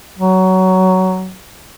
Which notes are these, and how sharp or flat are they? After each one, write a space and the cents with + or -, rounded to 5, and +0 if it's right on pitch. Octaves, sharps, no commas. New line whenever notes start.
F#3 +15